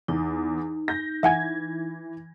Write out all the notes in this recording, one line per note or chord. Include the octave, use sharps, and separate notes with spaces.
E2 D#4
G6 A#6
E3 E5 F#5 G#5 G#6